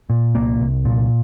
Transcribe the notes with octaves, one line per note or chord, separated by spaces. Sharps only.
A#2
C2 A#3
C2
A#2